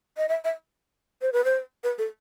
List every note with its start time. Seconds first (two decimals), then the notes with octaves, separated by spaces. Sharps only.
0.17 D#5
0.29 E5
0.45 E5
1.22 C5
1.33 B4
1.45 C5
1.84 B4
1.98 A4